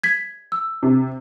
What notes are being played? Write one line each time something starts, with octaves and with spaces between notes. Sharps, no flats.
G#6 B6
E6
C3